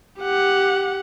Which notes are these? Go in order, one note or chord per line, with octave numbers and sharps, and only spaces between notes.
G4 F#5